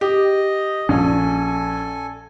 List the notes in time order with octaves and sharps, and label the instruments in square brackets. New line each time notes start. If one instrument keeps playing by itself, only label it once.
[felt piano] G4 [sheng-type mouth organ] D#5
[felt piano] A#1 [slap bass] C#4 [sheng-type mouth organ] A4 G#5